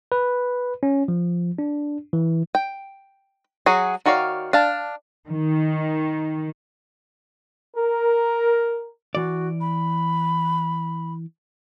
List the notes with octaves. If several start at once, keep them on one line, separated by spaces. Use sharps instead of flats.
B4
C#4
F3
D4
E3
G5
F#3 F#4 G#4
D#3 F#4 C#5 D5 F5
D4 F5 A5
D#3
A#4
E3 F#4 D5
B5